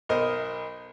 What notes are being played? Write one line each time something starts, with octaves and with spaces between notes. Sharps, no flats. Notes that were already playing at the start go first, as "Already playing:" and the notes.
B1 A#4 C5 D#5